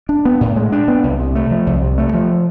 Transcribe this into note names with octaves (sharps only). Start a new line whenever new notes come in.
D4
B3
A2
G#3
D4
B3
C2
C3
A3
F3
C2
C3
A3
F3